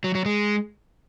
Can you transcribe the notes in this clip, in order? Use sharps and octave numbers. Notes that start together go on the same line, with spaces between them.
F#3
F#3
G#3